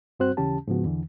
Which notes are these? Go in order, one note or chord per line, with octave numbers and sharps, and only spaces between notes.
G2 G3 C4 F#4 C5 F#6
D#2 C#3 E3 C#4 G4 A5
G#2 C#3 F3 B3 F#4
E2 D3 E3